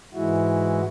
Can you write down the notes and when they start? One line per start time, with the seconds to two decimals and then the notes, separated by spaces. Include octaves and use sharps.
0.14 G#2 E3 G#3 E4 F#4